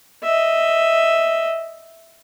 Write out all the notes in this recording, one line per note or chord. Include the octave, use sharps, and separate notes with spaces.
D#5 E5